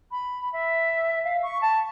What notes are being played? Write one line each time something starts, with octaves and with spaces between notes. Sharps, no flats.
B5
E5
F5
C#6
A5